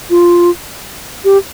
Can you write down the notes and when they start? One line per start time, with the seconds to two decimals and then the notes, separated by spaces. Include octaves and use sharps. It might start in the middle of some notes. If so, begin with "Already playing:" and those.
0.10 F4
1.24 G4